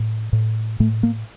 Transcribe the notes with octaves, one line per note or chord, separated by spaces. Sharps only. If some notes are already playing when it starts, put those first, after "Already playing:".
Already playing: A2
A2
A2 A3
A#3